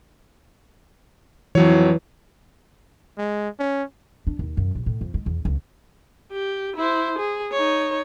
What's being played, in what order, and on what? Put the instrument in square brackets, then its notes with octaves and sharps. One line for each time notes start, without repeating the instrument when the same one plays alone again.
[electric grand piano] F2 F#3 C#5 [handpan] E3
[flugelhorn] G#3
C#4
[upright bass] D4
D#2
F#2
A#1
A2
F2
G#3
E2
C#2
[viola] G4
E4 C5
G#4
D#4 C#5